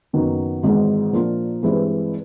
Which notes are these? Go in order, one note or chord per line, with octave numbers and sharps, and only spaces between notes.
F#1 F#2 D#3 F#3 B3
G#1 G#2 E3 G#3
A#2 F3 A#3 D4 F4
G2 E3 G#3 C4 E4